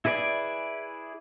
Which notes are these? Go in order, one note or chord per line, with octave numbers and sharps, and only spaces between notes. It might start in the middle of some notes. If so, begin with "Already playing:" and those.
E4 G#4 B4 D5 G#5